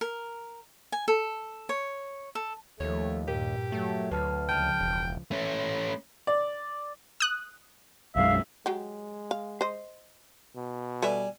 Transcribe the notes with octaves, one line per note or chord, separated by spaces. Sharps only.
A#4
G#5
A4
C#5
A4
D#2 F3 A3 C#5
G2 A#2 G4 A#4
F#3 A3
D2 B4 A5 F6
C#2 F3 G5 A5 F6
E1
A3 C#4
D5
D#6 F#6
B1 F#2 G#3 E5 F5
F#3 G#3 G4
F5
C5 D#5
B2
G3 A4 B4 E5 G#5